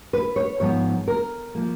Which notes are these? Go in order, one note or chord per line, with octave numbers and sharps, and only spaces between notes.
B4
C#5
G#2 F3 B3 C#5
A#4
F3 A#3